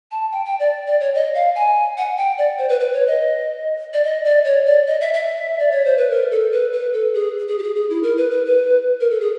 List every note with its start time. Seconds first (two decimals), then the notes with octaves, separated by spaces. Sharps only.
0.11 A5
0.32 G5
0.45 G5
0.60 D5
0.87 D5
1.00 C#5
1.15 D#5
1.35 F5
1.55 G#5
1.97 F#5
2.17 G5
2.38 D5
2.59 C5
2.69 B4
2.80 B4
2.94 C#5
3.07 D#5
3.94 D5
4.04 D#5
4.25 D5
4.45 C#5
4.66 D5
4.87 D#5
5.01 E5
5.14 E5
5.59 D5
5.72 C#5
5.85 C5
5.97 B4
6.11 A#4
6.31 A4
6.52 B4
6.73 B4
6.94 A4
7.14 G#4
7.49 G#4
7.59 G4
7.63 G#4
7.76 G#4
7.90 E4
8.03 A#4
8.17 B4
8.31 B4
8.46 B4
9.01 A#4
9.11 A4
9.21 G#4